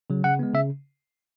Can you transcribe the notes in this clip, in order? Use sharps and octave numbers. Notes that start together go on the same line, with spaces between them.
C#3 F#3
C#3 F#5
G#3 B3
C#3 E5